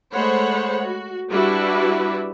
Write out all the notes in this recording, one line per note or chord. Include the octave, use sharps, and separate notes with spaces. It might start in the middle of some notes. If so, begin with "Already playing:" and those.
G#3 A3 C5 C#5 F#5 B5
F#4
G3 D4 E4 F#4 B4 E5